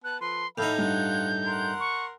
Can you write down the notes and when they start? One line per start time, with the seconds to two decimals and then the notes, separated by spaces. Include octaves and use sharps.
0.04 B3 A5 F#6
0.21 F3 A4 B4 C6
0.58 A2 D#4 E5 F5 B5 G6
0.79 G2 F4 F#5
1.46 A#4 F#5 C6
1.80 C#6